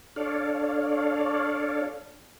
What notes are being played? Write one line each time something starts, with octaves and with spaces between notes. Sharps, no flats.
D4 A4 C#5 D5 F5